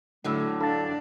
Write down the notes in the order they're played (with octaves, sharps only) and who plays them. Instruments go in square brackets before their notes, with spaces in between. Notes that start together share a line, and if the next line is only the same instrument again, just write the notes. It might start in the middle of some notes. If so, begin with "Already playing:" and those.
[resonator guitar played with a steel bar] A2 D3 F#3 [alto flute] A3
[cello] D4 [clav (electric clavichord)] A4 A5 [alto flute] F5